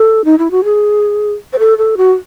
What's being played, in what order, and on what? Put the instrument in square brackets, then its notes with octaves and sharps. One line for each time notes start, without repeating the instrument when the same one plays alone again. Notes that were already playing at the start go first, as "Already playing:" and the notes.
Already playing: [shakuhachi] A4
D#4
E4
F#4
G#4
C5
A4
A4
F#4